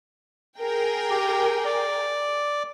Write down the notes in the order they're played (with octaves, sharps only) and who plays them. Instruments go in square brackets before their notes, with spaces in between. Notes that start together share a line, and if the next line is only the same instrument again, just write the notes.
[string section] G#4 A#4 G5
[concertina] G4
D5